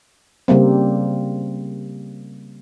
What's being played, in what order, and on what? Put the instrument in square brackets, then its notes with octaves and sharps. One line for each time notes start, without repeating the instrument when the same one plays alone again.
[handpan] C#3 G3 A#3 C4